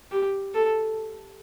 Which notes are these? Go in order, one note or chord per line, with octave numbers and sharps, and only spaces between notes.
G4
A4